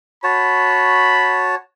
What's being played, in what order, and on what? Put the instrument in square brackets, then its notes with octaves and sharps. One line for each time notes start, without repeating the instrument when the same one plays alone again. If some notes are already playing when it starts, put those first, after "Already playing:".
[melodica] F#4 C#5 A5 [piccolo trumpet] B5